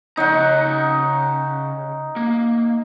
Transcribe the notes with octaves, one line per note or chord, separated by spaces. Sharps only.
C#3 D#4 C#5 F#5 A#5
A#3